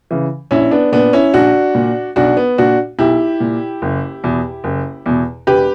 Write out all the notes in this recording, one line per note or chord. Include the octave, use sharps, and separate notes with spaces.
C#3 E3
A#1 C#4 E4
B3 D4
A#2 B3 D4
C#4 E4
A#1 D4 F#4
A#2
B1 D4 F#4
B3
A#2 D4 F#4
B1 E4 G4
A#2
F#1
E2 B2
F#1
E2 B2
E1 G4 B4